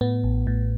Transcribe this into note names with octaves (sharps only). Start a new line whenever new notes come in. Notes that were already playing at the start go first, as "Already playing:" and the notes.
A2 B3
A1
A2